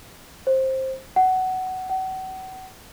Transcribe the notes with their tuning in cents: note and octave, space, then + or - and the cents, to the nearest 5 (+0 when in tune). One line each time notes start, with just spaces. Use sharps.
C5 +15
F#5 +15
F#5 +35